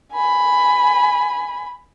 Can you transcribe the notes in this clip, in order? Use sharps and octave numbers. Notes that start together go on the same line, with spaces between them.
G#5 B5